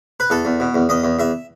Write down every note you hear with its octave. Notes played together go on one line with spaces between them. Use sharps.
B4
E2 A4
E2
B2
E2
E2 D#5
E2
E2 E5